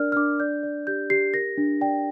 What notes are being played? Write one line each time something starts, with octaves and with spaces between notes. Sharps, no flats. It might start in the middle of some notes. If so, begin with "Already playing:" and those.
Already playing: D4 A#4 D5 F6
F6
D4 D6
D5 G6
D5
G4 G6
G4 C7
A#4 A#6
D4
D5 G5